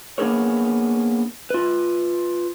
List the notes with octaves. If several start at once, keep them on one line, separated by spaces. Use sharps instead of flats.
A#3 B3 D4 G#4 A#4 C#5
F4 B4